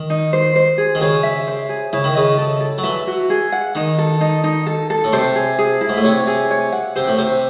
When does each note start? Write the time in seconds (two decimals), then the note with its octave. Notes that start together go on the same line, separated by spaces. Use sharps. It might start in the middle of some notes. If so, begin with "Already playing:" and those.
Already playing: D#3
0.10 D#4
0.33 C5
0.56 C5
0.78 G#4
0.95 D#3
1.01 C#3 G#4
1.23 E5
1.47 C5
1.69 G#4
1.93 C#3 E4
2.04 D#3
2.15 C#3 D#5
2.38 A4
2.61 A4
2.78 F#3
2.83 E3 E5
3.07 F#4
3.30 G#4
3.52 F#5
3.75 D#3 D#4
3.98 A4
4.21 D#4
4.44 D#4
4.66 A4
4.90 A4
5.04 A2
5.13 C3 C5
5.35 G#4
5.58 G#4
5.81 E4
5.89 G#2
5.97 A2
6.04 C3 C#5
6.27 G#4
6.51 C#5
6.72 F#5
6.96 C3 C5
7.07 A2
7.18 C3 C5